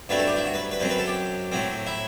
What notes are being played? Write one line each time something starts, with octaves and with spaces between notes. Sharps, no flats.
G2 F#3 A3 C4 B4
A4
G4
E4
F#4
B4
B4
F#2 F#3 C4 C5
B4
A4
G4
A2 F#3 C4
E4